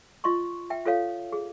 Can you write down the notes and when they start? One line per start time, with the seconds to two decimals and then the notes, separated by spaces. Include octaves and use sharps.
0.24 F4 D#5 C6 C#6
0.70 E5 G5
0.85 F4 A4 C#5 F5
1.32 G#4